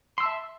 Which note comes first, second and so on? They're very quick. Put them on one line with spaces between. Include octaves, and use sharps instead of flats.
C6 E6 A5 E5